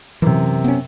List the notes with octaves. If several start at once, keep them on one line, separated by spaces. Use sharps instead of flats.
F#2 C3 E3
B3 C#4